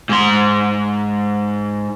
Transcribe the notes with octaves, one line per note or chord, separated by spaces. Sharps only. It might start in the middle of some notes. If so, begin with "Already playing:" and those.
G#2 C6